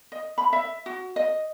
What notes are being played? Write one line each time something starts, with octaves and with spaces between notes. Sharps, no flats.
D#5
B5
E5
F#4
D#5